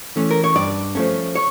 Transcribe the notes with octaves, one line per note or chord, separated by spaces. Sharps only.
E3 A3 C#4
A#4
C#5
G2 D5
F3 A3 C#4
C#5